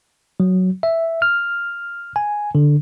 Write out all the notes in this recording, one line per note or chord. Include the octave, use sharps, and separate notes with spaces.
F#3
E5
F6
G#5
D3